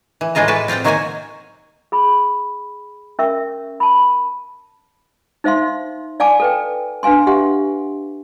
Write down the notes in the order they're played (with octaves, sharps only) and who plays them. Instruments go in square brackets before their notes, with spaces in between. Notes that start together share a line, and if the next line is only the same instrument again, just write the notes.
[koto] E3
A2 E3 G#3 F4 D#5 A#5
F#4 B4 D5
C4 F4 D5 F#5 G5
D#3 F#3 A#3 F#4 C#5 G#5
[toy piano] G#4 B5
C#4 A#4 E5 C#6
A5 B5
D#4 C5 E5 F5 C6
D5 F5 G#5 A5 D6
A4 B4 G5
D4 B4 F5 G#5 C6
G4 E5 F#5 C6